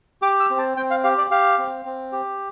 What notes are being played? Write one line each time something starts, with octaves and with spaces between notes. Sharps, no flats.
G4 D6
E6
C4
A5
C4 G5
F5
G4 F5
D5
G4 F5
C4
C4
G4